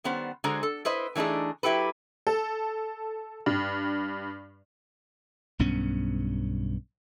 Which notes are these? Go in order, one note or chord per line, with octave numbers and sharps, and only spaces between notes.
D#3 G3 B3 C#4 C5 F#5
D3 G#3 F#4 G#4 C5 A#5
A4
E4 B4 C5 D#5
E3 A3 D4 D#4 G#4
F#3 E4 G4 A4 B4
A4
G2
B1 G2 B3 C#4